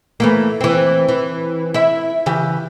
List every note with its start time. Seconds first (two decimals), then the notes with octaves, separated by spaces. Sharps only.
0.20 E3 A3 A#3
0.61 E3 C4
1.09 E3
1.74 E4 E5
2.26 C#3 E3 G4